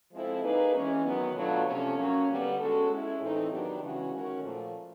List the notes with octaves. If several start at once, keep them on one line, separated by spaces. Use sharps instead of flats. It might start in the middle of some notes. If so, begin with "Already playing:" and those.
F3 G#3 C4 E4 A4
A#3 D#4 G#4 B4
E3 G#3 C#4
D#3 F#3 B3
B2 F#3 A3 D4 F4
C3 F3 A3 C#4
F#3 A#3 C#4
D3 G3 B3
G#3 C#4 F#4 A4
G#3 C#4 E4
A2 E3 A3 C4 D#4
D#3 F#3 B3 D4 G4
C#3 E3 G#3 C#4 F#4
D#3 G#3 C#4 F#4 A#4
A#2 F3 A3